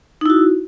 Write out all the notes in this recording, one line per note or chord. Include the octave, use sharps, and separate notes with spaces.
D#4 E4 F#4